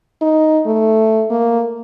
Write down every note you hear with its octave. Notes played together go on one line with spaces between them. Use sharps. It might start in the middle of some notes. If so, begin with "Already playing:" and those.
D#4
A3
A#3